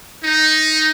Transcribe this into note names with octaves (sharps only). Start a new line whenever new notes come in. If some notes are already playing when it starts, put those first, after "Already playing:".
D#4